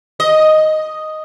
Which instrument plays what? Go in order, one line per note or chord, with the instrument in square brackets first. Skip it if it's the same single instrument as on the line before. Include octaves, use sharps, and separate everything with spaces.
[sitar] D#5